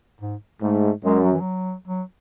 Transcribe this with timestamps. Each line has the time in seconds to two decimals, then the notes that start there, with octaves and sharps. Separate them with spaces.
0.21 G#2
0.62 G#2 A3
1.04 F#2 G#3
1.24 F#3
1.32 E3
1.40 F#3
1.87 F#3